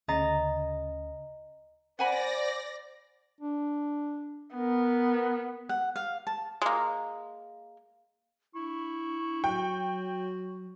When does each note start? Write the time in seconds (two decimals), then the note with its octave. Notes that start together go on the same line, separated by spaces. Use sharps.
0.08 D2 C#3 D#5 A#5 A6
1.99 C5 D5 F#5 G#5 B5 A#6
3.41 D4
4.54 B3 A#4
5.69 F#5
5.96 F5
6.27 A5
6.62 G#3 A#3
8.55 D4 E4 C#6
9.44 F#3 F#4 G5